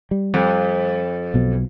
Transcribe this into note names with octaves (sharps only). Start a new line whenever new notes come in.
G3
F2
B1 B2